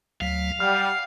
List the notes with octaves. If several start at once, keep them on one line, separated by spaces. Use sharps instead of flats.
D2 F#3 F5 B6
G3 F#5 F6 C7